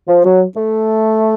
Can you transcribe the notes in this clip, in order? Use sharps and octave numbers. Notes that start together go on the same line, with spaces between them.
F3
F#3
A3